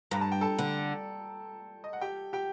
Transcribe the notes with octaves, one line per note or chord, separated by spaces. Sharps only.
G2 A#5
A5
G5
A4 A5
D3
D#5
F#5
G4 G5
G4 G5